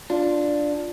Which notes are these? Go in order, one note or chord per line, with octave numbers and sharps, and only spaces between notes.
D4 F4